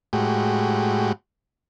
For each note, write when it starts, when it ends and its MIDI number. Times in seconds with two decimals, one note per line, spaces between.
0.13 1.12 45
0.13 1.12 56
0.13 1.12 66
0.13 1.12 67